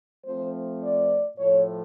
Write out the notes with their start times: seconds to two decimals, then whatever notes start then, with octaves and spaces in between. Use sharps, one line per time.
0.24 F3 A3 C4 C5
0.81 D5
1.37 A2 F3 A3 C#5